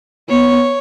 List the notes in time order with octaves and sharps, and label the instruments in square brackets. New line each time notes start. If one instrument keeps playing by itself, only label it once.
[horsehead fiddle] B3 [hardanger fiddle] C#5